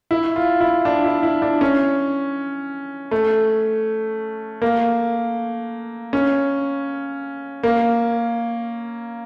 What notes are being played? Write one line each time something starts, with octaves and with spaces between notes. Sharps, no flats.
E4
F4
E4
D4
E4
E4
D4
C#4
A3
A#3
C#4
A#3